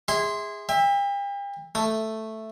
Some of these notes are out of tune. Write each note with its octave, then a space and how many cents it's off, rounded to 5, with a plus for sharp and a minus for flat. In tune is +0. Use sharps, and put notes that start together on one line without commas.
G#4 -20 E5 -25 C6 +0
E5 -5 G5 +40
A3 +0 D#6 +0